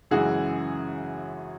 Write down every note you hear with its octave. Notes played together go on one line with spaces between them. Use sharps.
F#2 C#3 E3 G#3 F#4 G#4